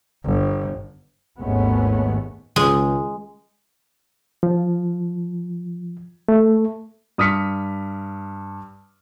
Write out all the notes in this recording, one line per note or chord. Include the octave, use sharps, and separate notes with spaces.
G1
G#1 D#2 G#3 A3 B3 C#4
C#2 G#3
F3
A3
G2 D#6 F6 B6 C#7